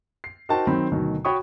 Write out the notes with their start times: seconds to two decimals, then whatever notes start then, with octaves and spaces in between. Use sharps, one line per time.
0.24 C7
0.49 D#4 F#4 A#4 C5 G5 A5
0.67 D#3 F#3 C4 B5
0.91 D2 B2 D#3 F#3
1.25 F#4 C#5 G5 B5 C#6 D#6